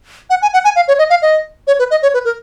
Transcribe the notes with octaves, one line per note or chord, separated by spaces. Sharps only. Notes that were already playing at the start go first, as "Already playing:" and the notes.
F#5
G#5
F#5
G#5
F5
C#5
D#5
F5
D#5
C#5
B4
D#5
C#5
B4
A#4